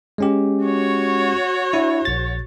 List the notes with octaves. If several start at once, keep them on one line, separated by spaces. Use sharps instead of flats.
G#3 C#4 G4
F#4 C#5
D4 E4
A#1 A6